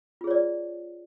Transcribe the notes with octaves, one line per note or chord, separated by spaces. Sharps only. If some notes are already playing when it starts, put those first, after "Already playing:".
F4 G#4 C#5 D5